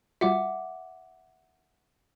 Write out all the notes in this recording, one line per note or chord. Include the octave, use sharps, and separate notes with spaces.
G3 F4 F#4 E5 F#5 D6